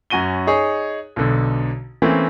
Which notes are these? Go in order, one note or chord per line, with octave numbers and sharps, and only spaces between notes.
F#2 C#4 F#4 D#7 G7
D#4 G#4 C#5
B1 B2 D3
E3 A3 A#3 C4 C#4